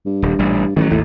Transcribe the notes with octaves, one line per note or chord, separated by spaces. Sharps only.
G2
D#1
A1 A#2 G3
A1 D#3 F3 F#3
G#1 D#2 A2